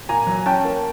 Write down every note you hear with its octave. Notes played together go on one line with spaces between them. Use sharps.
A#2 G#5 A#5
F#3
C#4 G5 A5
A#3